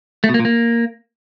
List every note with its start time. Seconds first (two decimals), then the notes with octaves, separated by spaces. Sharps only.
0.24 A3
0.29 B2
0.34 A#3
0.40 A#2
0.45 A#3